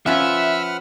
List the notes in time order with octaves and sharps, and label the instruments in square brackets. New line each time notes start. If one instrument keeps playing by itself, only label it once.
[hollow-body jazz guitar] F3 C#4 F4 [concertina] B4 F#5 F6 [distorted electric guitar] E5